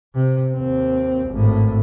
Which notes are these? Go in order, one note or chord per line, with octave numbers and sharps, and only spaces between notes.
C3
D#2 C4
G#1 A2